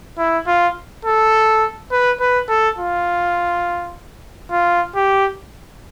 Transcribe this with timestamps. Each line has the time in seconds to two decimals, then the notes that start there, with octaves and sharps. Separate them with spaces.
0.18 E4
0.47 F4
1.05 A4
1.92 B4
2.20 B4
2.49 A4
2.78 F4
4.52 F4
4.96 G4